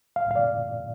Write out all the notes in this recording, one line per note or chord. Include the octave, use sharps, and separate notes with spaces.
F5
F5
D5